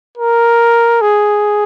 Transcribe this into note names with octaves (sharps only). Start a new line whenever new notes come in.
A#4
G#4